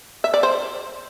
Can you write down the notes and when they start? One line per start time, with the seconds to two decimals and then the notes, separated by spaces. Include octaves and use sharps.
0.24 E5
0.34 D5
0.43 C5